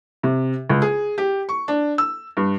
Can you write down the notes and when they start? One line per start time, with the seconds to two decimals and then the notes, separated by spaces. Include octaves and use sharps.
0.23 C3
0.70 C#2
0.82 G#4
1.18 G4
1.49 C#6
1.68 D4
1.98 E6
2.37 G2